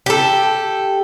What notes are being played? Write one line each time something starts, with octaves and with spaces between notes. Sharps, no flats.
G4 A4